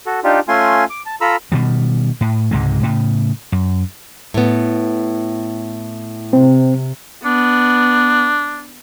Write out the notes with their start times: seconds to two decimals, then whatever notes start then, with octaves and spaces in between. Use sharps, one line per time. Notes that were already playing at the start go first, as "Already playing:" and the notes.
0.06 F#4 A4
0.24 D4 D#4 F4 G4
0.48 A3 C#4 F4 G#5 C6
0.90 D6
1.06 A5
1.21 F4 A4 A#5 B5 E6
1.52 B2 D#3 G3
2.21 A2
2.51 C#2 G#2 C3 G#3
2.83 A2 C#3
3.52 F#2
4.34 A2 B3
6.33 C3 C4
7.25 B3 D4